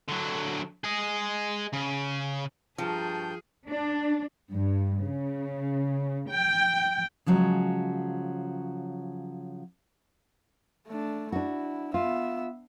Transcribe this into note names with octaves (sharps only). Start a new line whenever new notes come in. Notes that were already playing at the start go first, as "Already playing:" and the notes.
D3 F#3
G#4 D#5
C#3
G2 F3 G#4 G5 A5 A#5 C#6 G6
D4
G2
C#3
G5
C#3 F3 F#3 G#3
A3 D4
D4 E4 F#4
B3 F4 E5